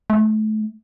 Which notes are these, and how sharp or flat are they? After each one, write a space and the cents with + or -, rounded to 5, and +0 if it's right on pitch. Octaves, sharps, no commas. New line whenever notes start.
A3 -30